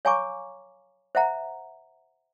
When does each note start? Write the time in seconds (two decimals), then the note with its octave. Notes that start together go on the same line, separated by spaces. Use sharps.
0.05 C#5 F5 G#5 A#5 C#6 D6
1.15 C5 E5 F#5 A#5